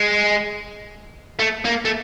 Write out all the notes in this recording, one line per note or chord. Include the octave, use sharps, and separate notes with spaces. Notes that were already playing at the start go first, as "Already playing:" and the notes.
Already playing: G#3
A3
A#3
A3